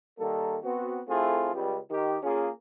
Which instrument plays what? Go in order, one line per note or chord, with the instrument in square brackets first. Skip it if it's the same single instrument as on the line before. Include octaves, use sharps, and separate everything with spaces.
[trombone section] D#3 G3 A#3 A4
B3 C4 F#4
A3 C4 E4 F4 G#4 A4
C#2 G3
D#3 G4
A#3 C#4 F4 G#4